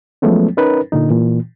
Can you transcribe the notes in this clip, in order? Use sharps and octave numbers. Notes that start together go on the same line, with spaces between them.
F3 F#3 G#3 A3 B3 C#4
C#4 D#4 A#4 B4
A#2 D3 D#4
A#2 E3